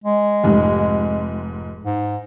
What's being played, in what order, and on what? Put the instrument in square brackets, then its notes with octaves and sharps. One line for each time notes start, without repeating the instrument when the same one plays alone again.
[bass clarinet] G#3
[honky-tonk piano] F1 G#2
[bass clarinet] G#2